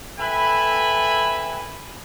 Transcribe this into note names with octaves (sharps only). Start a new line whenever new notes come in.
A4 B4 E5 G5 G#5 B5